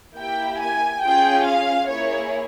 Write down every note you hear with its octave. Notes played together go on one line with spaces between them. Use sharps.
A#3 E4 G4 G5
G#5
C#4 F4 G#4 G5
F5
A#3 E4 G#4 C#5